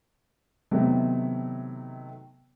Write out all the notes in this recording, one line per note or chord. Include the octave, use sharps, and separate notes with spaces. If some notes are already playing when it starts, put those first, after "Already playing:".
C3 D#3 F#3 A3 B3